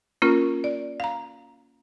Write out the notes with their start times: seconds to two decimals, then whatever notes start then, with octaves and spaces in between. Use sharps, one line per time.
0.22 A#3 C#4 F4 A#4
0.64 D5
1.00 F5 A#5